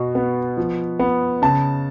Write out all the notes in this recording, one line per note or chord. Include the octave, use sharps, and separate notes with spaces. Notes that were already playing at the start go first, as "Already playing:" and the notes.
Already playing: B2
B3
F3
B3
C#3 A5